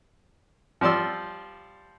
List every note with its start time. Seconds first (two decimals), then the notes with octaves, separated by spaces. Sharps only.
0.81 F3 G3 D5 C6 E6